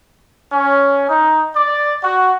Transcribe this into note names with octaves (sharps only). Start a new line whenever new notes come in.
C#4
D#4
D5
F#4